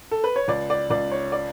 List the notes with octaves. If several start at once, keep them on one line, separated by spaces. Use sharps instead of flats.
A4
B4
C#5
C#2 D5
D5
C#2 D5
C#5
D5